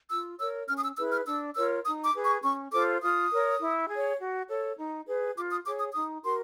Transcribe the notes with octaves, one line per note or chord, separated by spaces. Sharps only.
F4 E6
A#4 C#5 E6
C#4 F6
D#6
E6
E4 G#4 B4 E6
F6
D4 E6
F4 A#4 C#5 E6
D#4 D#6
D6
G#4 B4
C#6
C#4 C#6
F4 A4 C5 D6
F4 D#6
A#4 C#5
E4
G#4 C#5
F#4
A4 C#5
D#4
G#4 B4
F4 D6
D#6
G#4 C#5 D6
D#6
D#4 D#6
F#4 A#4 C6